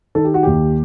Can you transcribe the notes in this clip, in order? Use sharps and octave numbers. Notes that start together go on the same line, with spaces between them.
D#3 A4
G4
F#4
D#2 G4